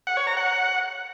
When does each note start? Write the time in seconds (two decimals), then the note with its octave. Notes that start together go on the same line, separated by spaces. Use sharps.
0.07 F#5
0.17 C#5
0.27 A#5
0.37 F#5